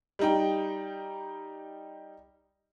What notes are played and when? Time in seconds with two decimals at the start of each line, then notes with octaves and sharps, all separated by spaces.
0.19 G3 D#4 G5